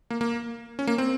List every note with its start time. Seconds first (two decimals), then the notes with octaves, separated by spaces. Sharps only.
0.10 A#3
0.21 A#3
0.79 C#4
0.87 A#3
0.98 C4